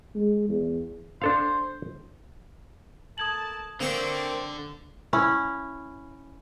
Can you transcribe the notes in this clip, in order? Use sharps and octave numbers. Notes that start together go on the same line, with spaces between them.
G#3
E2
D4 A4 C5 F5
A#3 A4 A5 D#6 G#6 F#7
D3 A#3 C4 C5 C#6
C#4 E4